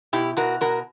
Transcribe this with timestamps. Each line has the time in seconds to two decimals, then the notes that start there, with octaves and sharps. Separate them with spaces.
0.13 B2 E4 G4
0.37 B2 F#4 A#4
0.61 B2 F#4 A#4